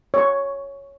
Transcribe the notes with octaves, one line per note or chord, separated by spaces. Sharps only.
C#5 C#6